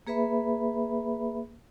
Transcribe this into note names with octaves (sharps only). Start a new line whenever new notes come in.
A#3 G#4 B4 E5 B5